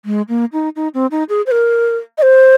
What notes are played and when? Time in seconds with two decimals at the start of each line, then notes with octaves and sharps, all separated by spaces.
0.05 G#3
0.29 A#3
0.53 D#4
0.76 D#4
0.94 C4
1.11 D#4
1.29 G#4
1.46 C5
1.51 A#4
2.18 D#5
2.22 C5